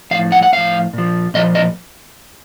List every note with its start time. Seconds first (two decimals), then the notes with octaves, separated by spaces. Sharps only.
0.11 A2 F3 F5
0.32 F#5
0.43 F#5
0.53 A2 F3 F5
0.93 A#2 F3
1.34 A#2 F3 D#5
1.55 D#5